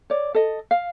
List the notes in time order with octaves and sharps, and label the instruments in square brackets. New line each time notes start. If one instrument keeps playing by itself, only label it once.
[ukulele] C#5 D5
A4 D#5
F5